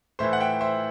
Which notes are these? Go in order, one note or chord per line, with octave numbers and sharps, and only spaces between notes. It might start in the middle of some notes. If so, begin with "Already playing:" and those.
A2 E3 C5 E5
F#5
E5 G5
C5 E5